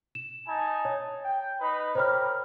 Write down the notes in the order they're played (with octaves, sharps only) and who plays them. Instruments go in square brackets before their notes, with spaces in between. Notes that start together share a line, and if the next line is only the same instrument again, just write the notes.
[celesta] E7
[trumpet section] D#4 G#5 A5
[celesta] C#5
[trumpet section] G5
D#4 B4 B5
[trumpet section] G4 A#4 B5 [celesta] C5 C#5 F6